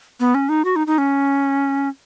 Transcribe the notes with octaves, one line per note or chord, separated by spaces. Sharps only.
B3
C#4
D#4
F#4
D#4
D#4
C#4